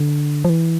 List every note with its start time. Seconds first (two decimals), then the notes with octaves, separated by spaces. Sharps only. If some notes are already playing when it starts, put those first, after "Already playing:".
Already playing: D3
0.45 F3
0.49 E3